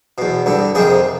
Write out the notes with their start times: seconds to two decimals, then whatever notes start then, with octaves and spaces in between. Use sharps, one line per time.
0.18 E2 B2
0.46 G2 D3
0.75 F2 C3 D#3 G#4